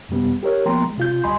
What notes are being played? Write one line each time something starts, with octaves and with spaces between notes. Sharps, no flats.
F#2 C3 G3 B3
G4 A#4 C#5
F3 A#3 B3 G5 A#5 C6
G#3
C3 F4 G6
D2 G3 D#5 G#5 B5 C6